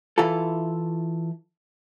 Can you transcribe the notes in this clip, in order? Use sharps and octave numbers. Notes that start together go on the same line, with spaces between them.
E3 E4 F4 A4